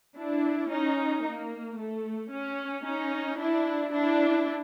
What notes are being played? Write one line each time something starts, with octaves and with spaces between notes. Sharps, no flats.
D4 E4
C#4 D#4
A#3
A3
C#4
C#4 D#4
D4 E4
D4 E4